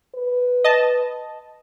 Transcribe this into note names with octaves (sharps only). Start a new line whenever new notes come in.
B4
D#5 A5